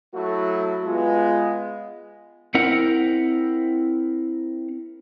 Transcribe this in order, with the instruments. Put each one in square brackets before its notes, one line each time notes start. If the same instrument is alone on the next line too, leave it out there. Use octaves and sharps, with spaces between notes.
[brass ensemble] F#3 A3 E4 F#4
G#3 B3 F4
[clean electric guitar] C4 E4 A#4 F#5